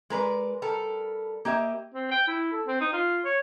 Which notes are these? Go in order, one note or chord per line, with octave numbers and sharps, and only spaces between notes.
G#3 A#4 B4 D5
G3 A4 A#4
A#3 G4 D#5 E5
C4
G5
E4
A4
C4
D#4
F4
C#5